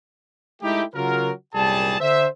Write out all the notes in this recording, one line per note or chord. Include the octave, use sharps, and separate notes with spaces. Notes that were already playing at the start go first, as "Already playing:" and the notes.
G#3 A3 D#4 E4 G4
C#3 F#3 F4 F#4 A#4
C2 F#2 A#2 G3 G#4 A5
D3 C5 E5